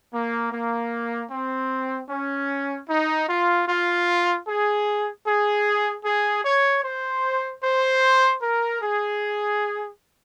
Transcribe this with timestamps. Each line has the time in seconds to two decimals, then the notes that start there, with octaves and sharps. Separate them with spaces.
0.13 A#3
0.52 A#3
1.31 C4
2.10 C#4
2.89 D#4
3.29 F4
3.68 F4
4.47 G#4
5.26 G#4
6.05 G#4
6.45 C#5
6.84 C5
7.63 C5
8.42 A#4
8.82 G#4